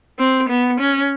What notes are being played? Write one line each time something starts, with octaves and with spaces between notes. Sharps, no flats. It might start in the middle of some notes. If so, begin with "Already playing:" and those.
C4
B3
C#4